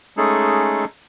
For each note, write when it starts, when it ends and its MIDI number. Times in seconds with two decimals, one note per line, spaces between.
0.17 0.85 56
0.17 0.85 57
0.17 0.85 61
0.17 0.85 63
0.17 0.85 68
0.17 0.85 69